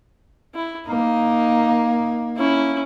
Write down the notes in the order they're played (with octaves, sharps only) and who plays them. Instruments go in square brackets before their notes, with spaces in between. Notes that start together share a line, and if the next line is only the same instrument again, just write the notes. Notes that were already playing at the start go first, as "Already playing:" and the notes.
[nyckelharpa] E4
[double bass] A#3 [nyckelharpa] D#4
[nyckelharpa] C#4 E4